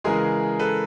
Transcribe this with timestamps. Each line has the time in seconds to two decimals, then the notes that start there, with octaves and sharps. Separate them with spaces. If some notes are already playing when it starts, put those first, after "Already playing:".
0.04 C#3 E3 G#3 G#4 A#4
0.59 A4 B4